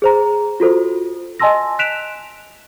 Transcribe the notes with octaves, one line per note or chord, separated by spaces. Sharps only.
G#4 C5 A#5
F4 F#4 A4 C5
D#5 G#5 A5 C6 E6 A#6
F#6 B6 D7 E7 F7